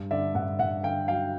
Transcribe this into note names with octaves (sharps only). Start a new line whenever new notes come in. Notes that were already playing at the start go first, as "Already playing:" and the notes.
Already playing: G2
D3 D5 E5
G2 E5 F#5
G2 E5 F#5
D3 F5 G5
F#3 F5 G5